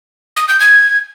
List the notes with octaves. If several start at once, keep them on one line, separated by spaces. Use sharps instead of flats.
D#6
G6
G#6